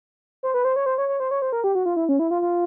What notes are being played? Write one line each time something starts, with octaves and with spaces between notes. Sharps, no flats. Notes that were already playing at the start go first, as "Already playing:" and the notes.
C5
B4
C5
C#5
C5
C#5
C#5
C5
C#5
C5
A#4
G4
F#4
F4
E4
C#4
E4
F4
F4